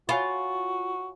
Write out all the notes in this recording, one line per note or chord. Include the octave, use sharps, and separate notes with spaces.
F4 F#4 C#5 G#5 B5